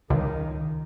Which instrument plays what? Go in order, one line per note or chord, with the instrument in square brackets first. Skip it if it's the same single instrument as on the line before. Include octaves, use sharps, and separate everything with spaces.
[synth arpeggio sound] C#2 [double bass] D#3